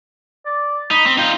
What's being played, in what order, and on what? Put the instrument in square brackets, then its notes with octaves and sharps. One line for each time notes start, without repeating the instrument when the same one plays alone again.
[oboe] D5
[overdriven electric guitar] D#4 [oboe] B5
[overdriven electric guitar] C4
[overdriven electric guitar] D#4 F4 [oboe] G5